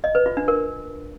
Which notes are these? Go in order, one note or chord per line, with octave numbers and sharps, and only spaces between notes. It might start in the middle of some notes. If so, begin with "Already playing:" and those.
D#5
B4
F4
D4
A#4